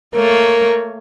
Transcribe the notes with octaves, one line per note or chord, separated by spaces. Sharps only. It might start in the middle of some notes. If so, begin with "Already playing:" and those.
A3 A#3 A#4 C#5